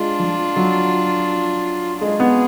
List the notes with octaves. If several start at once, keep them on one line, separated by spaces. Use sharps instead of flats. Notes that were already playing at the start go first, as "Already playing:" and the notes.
Already playing: G#3 D4 F4
F3
F#3
G#3 F4 G#4
B3